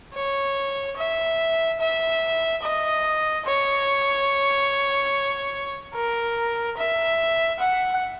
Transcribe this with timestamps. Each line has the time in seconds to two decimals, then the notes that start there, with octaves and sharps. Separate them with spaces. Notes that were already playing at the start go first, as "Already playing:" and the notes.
0.15 C#5
0.97 E5
1.80 E5
2.63 D#5
3.45 C#5
5.95 A#4
6.78 E5
7.60 F#5